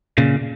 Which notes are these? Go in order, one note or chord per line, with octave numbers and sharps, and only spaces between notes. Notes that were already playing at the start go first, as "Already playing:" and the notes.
A#2 C#3